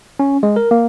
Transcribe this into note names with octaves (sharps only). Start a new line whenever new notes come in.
C#4
G#3
A#4
A#3